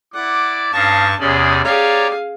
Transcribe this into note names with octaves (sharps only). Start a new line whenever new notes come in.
E4 D5 F#5 D6
G2 C#4 D#4 F5 A5 C#6
E2 C3 C#4 G#4 D5
G4 G#4 C#5 D5 F5 A#5